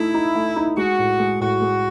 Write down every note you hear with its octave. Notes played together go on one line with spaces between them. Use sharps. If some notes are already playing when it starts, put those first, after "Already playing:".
Already playing: A3 D#4 E4
D#4
A3
D#4
G#3 F#4
A2
G#3
A2 F#4
G#3